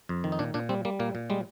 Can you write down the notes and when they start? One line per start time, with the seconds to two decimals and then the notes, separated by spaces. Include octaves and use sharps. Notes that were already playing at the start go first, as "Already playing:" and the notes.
0.09 F2
0.24 D#3
0.32 D#4
0.39 A#2 D4
0.54 A#2 D4
0.69 G3 C4
0.85 G3 A#3
0.99 A#2 A#3
1.15 A#2
1.30 G3 G#3